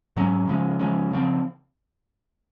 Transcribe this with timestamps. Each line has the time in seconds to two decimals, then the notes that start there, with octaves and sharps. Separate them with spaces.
0.16 G#2 F#3 C#4
0.47 C#3 F3 G#3 C#4
0.79 C#3 F3 G#3 C#4
1.11 C#3 F3 C4